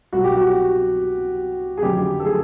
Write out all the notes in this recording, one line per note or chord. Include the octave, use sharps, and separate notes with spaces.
C2 B2 F#3 F#4
G4
F#4
G#4
F#1 F2 D3 F#3 G4
A4
G#4